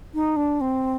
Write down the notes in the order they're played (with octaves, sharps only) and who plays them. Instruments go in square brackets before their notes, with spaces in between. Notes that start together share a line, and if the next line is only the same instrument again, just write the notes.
[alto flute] D#4
D4
C4